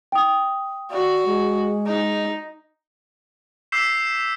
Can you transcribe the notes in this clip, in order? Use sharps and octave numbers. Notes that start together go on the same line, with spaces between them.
G5 D#6
F#4 D5
G#3
D#4
D6 E6 G6 B6 C7 E7